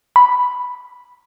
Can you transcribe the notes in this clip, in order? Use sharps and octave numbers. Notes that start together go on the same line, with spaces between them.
B5